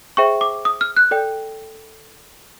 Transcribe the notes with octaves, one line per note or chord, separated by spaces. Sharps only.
G#4 C5 E5 G5 C#6
D6
D#6
F6
F#6
A4 D5 G5